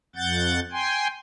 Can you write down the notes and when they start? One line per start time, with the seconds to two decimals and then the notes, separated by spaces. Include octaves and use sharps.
0.16 F2 F#5 G6 A6
0.72 G5 G#5 C6